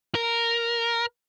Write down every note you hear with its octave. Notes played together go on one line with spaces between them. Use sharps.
A#4